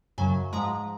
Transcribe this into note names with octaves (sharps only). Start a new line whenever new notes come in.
F#2 C#3 F#3 G#5
G#2 F3 G#3 A#5